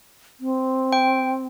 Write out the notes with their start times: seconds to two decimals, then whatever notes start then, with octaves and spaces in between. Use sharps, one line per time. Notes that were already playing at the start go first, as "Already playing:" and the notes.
0.40 C4
0.93 G5